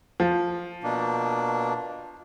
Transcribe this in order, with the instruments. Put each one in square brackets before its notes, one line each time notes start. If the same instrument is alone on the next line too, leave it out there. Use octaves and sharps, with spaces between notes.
[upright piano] F3
[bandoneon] B2 A#3 D4